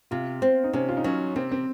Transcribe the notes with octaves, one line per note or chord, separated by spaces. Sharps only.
C3 F4
C4
D#4
C3 C#4
F4
D#4
F#3 C#4
C3 C4
C4